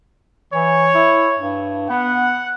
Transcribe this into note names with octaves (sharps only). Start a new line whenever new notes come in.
E3 C#5
E4
G2
B3 F#5